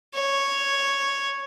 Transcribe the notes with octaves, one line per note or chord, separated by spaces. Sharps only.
C#5